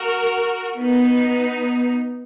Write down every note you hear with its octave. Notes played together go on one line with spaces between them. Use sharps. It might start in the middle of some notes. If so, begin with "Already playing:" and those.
Already playing: F#4 A#4
B3 D#4